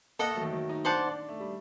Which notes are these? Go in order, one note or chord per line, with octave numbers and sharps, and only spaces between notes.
A#3 A4 D#5 F#5
A3
F#3
D#3
F#3
D#4
D4 C5 F#5 A5 D6
D4
D4
A3
G3